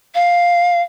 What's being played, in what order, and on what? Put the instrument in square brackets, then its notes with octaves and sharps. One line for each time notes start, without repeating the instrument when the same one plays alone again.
[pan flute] F5